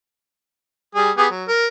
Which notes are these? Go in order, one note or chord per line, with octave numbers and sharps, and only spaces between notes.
G3 G#4
B3 G4 G#4
F#3
A#4